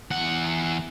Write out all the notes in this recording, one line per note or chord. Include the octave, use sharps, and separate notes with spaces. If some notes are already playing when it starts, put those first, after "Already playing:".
E2 F#5